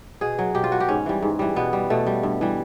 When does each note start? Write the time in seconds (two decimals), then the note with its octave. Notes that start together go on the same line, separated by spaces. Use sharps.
0.21 B2 G#4
0.39 F#3
0.55 B2 G4
0.64 F4
0.72 F#3 F#4
0.80 G4
0.88 G#2 C#4
1.06 E3 G3
1.22 G#2
1.39 E3 G3
1.56 B2 B3
1.73 G3
1.90 B2 A3
2.07 G3
2.23 G2
2.41 E3 G3